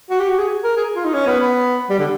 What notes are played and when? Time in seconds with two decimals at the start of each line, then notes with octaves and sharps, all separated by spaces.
0.10 F#4
0.19 G4
0.29 F#4
0.38 G#4
0.64 A#4
0.77 G#4
0.95 F4
1.05 D#4
1.14 C#4
1.27 B3
1.40 B3
1.90 G3
1.99 D3